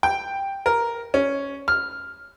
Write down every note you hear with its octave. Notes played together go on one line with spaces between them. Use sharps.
G5
A#4
C#4
F6